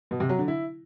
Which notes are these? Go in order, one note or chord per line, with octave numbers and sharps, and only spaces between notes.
B2
C3
F#3
D3
E4